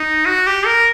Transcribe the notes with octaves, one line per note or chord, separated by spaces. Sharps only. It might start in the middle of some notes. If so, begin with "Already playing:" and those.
Already playing: D#4
F#4
G4
A#4